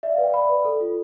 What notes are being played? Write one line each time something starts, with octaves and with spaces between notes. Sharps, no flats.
D5 E5
F5
B4
G5
D5 B5
B4
A4
F4